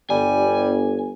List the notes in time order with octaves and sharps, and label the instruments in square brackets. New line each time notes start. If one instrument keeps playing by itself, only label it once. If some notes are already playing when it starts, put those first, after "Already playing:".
[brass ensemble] G1 [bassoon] G3 [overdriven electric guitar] G#5